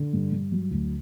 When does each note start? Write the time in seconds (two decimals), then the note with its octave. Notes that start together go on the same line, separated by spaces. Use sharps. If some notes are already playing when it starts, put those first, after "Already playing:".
Already playing: D3
0.13 G2
0.32 G2
0.52 F#3
0.71 D2